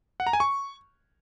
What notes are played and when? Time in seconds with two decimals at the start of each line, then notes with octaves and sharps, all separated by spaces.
0.20 F#5
0.27 A#5
0.33 G#5
0.40 C#6